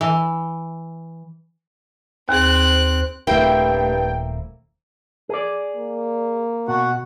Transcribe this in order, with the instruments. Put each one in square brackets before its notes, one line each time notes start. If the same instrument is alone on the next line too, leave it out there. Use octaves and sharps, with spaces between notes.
[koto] E3
[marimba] D#2 G#4 [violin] C4 F#6
[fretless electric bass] D#1 A3 [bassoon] G2 [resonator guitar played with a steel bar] A#3 C4 E4 [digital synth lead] G5
[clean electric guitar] G#4 D5
[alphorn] A#3
[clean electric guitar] B2 [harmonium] F#4 F#5